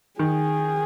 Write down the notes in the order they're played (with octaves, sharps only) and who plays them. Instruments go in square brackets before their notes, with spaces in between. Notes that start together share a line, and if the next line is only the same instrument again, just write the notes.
[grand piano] D#3 [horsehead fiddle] G#4